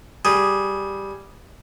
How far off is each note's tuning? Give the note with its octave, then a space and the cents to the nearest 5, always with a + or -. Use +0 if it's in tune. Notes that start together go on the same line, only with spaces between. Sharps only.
G3 +0 G#4 +0